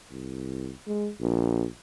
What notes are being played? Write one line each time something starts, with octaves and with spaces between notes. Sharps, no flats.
C2
G#3
A#1